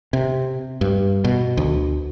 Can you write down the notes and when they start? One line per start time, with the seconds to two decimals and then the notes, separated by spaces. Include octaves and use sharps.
0.13 C3
0.81 G2
1.24 B2
1.57 D2